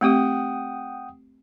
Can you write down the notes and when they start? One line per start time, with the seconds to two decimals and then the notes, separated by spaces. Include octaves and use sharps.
0.01 A3 C4 G4 F#5 G5 D#6